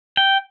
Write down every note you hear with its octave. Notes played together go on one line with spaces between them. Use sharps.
G5